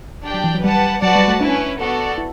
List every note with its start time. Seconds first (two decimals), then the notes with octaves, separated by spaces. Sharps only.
0.25 D4 G4 D5 G5
0.34 F#3
0.44 E3
0.54 F#3
0.63 G3 G4 B4 F#5 A5
1.02 F#3 F#4 B4 D5 F#5 A5
1.16 G3
1.28 A3
1.41 C#4 D4 E4 B4
1.79 B3 F#4 A4 D5
2.18 E4